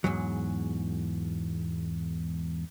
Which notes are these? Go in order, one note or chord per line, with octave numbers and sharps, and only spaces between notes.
E2 G#2 F#3